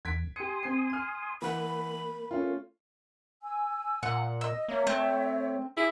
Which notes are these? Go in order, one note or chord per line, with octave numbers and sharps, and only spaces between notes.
E2 G#6 B6 D7
G4 G#5 C6 D#6 C#7
C4 C7
F6 D#7
E3 A#3 F#5 B5
A3 C#4 F4
G#5 E6
A#2 F#5
D#5 E6
A#3 C#5 E5
A3 C4
E4 G#4